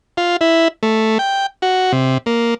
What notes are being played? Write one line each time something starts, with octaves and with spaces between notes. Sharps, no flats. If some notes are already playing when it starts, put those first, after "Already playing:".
F4
E4
A3
G5
F#4
C3
A#3